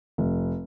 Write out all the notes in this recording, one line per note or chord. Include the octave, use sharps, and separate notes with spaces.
F1